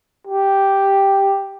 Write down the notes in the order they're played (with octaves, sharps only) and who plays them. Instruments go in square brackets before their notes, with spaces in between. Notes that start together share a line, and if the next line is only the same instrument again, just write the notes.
[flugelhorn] G4